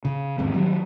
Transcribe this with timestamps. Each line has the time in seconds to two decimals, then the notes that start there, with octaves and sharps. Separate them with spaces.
0.05 C#3
0.38 G#1 E2 G#3 C4
0.54 D#3 F#3 G3